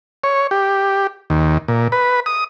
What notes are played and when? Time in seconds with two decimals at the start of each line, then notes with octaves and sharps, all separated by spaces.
0.24 C#5
0.51 G4
1.30 D#2
1.68 A#2
1.92 B4
2.26 D#6